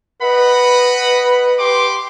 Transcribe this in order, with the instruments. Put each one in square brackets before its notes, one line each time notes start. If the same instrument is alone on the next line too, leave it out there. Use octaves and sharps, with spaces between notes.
[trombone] B4 [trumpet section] D#5 F#5 B5
[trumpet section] G4 C6 D6